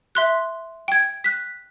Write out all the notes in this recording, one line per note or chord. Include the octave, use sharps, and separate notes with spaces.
E5 C6 F#6
G5 G#6
F#6 B6